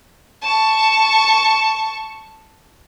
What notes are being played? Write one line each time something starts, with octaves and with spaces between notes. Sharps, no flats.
A5 C#6